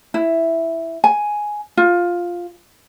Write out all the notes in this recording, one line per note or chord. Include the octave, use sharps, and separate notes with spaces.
E4
G#5
F4